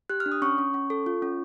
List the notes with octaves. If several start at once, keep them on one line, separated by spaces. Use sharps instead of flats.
G4 F#6
F6
D4
D#6
C#4 C#6
C#4
C#4
A4
F4
C#4